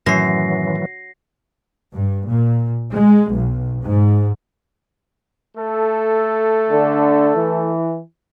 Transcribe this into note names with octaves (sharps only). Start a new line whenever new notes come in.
F#2 A2 D#3 E3 F#3 A3 A#6 C7
G2
A#2
G#3
B1
G#2
A3 A4
D3
E3